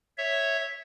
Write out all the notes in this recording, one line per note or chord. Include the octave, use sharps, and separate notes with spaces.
C#5 E5